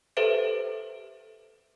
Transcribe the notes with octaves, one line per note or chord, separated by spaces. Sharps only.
G4 A4 B4 C5 E5 D7